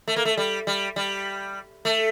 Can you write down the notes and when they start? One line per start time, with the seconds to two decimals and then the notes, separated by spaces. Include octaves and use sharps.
0.08 A3
0.16 A#3
0.25 A3
0.37 G3
0.67 G3
0.96 G3
1.85 A3